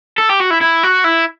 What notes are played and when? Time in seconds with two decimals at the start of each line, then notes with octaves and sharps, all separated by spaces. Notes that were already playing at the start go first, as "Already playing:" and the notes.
0.18 A4
0.30 G4
0.40 F#4
0.50 E4
0.61 E4
0.83 F#4
1.04 E4